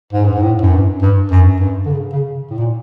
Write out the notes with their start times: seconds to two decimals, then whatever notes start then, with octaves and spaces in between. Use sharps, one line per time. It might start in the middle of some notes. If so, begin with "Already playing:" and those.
0.13 G#2
0.25 G2
0.33 G#2
0.42 A2
0.62 F#2
0.73 G2
1.02 G2
1.31 F#2
1.60 G2
1.85 D3
1.90 C#3
2.13 C#3
2.50 A2
2.57 A#2